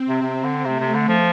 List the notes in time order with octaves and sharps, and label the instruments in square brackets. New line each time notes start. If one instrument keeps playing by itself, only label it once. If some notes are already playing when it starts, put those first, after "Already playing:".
Already playing: [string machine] C4
[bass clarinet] C3
[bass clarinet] C3 [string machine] C4
[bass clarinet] D3
[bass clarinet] C3 [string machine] A3
[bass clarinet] C3
D3
F3